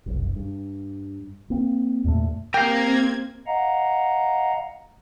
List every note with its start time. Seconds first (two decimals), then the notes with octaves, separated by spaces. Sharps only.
0.06 F1 B1 F#2
0.36 G2
1.50 A#3 C4
2.04 E2 G2 A#2 A3
2.54 A#3 C4 G4 A#4 F5 G5 G#6
3.47 D#5 F5 F#5 A#5